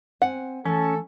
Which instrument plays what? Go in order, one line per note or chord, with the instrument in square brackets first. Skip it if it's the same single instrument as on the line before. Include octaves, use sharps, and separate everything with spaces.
[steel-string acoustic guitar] C4 G#5 [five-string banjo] F#5
[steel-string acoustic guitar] E3 A3 [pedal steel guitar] C#4 [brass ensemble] A4